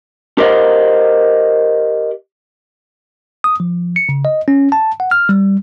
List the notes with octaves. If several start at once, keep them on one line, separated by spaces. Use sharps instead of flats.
G4 A#4 C5 D#5 F5 F#5
D#6
F3
C#7
C#3
D#5
C#4
A5
F#5
F6
G3